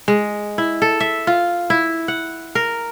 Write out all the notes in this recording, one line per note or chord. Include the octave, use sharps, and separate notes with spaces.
G#3
E4
A4
E5
F4
E4
F#5
A#4